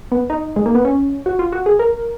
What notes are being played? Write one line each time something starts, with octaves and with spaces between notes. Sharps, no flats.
B3
D#4
G#3
A#3
B3
C#4
F#4
F4
F#4
G#4
A#4